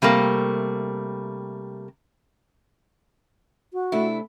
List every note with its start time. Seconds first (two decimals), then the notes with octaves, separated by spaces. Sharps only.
0.02 C3 G3 A3 A#3
3.73 F#4
3.92 C3 A3 D4 E4